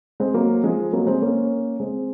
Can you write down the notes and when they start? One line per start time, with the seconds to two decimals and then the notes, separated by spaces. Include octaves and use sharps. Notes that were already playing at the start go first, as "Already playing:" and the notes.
0.20 G#3 C4
0.34 F#3 A#3
0.64 F3 G#3
0.93 F#3 A#3
1.07 G#3 C4
1.22 A#3 C#4
1.80 G#3 C4